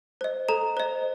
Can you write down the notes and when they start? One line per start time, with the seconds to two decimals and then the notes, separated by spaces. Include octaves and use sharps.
0.21 C5 D#5
0.49 A4 A#5
0.77 C5 D#5